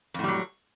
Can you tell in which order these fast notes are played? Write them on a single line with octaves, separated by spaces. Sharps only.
F2 A2 G3 F#3